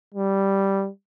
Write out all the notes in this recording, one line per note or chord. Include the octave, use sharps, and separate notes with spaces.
G3